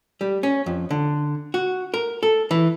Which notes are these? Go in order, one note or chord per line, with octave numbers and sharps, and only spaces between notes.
G3
C#4
F2
D3
F#4
A#4
A4
E3